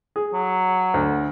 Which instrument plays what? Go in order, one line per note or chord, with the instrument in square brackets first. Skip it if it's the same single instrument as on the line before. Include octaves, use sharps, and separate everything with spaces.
[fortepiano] G#4
[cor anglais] F#3
[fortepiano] D2